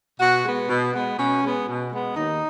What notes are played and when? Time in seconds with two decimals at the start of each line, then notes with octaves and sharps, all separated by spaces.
0.20 B2 F#4
0.44 G#3 B3
0.68 B2
0.93 G#3 B3
1.17 B2 C#4
1.42 G#3 B3
1.67 B2
1.92 G#3 B3
2.15 D#2 D#4